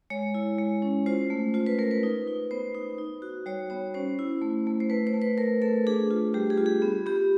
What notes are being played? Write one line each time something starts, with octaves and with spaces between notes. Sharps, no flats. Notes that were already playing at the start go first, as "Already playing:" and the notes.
G#3 C#5
E4
G#3
C#4
F4 C5
A3
F4 C5
B4
A3 A#4
B4
D#4
D#4
B3 C5
D#4
D#4
F#4
G3 C#5
B3 C#5
C#4 C5
E4
A3
A3
C5
A3 B4
C5
A3
B4
A3 A#4
A3 A4
D4 G#4
F4
G3 G4
G#4
F4
G#4
B3
B3 G4